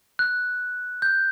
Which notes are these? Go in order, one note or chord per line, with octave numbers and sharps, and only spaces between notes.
F#6
G6